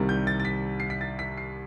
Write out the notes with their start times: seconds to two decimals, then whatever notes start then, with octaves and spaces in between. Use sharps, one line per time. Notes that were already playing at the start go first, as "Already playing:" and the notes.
Already playing: C2 C3 D#3 G3
0.09 G6
0.27 A6
0.40 A6
0.45 B6
0.80 C7
0.90 B6
1.01 A6
1.19 B6
1.37 C7